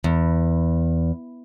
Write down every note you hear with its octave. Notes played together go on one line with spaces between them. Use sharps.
E2